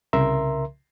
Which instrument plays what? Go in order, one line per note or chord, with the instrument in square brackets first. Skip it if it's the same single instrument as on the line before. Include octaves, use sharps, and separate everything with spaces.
[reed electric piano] C2 C#3 A#4 E5 A#5 C6